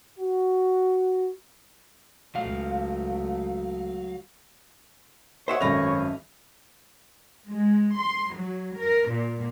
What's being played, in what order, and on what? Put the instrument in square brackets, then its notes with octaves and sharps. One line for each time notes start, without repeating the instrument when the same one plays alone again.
[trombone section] F#4
[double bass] C#2 A3 [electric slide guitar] F#3 F5
[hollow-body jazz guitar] C5 E5 F#5 [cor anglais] C#5 [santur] D#5
[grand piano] G#1 A#6 F7 [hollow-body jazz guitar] F#2 C#4 [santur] A3 B4
[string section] G#3
C6
F#3
A#4
A#2